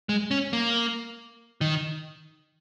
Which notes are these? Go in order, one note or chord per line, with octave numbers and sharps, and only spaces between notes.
G#3
C#4
A#3
D#3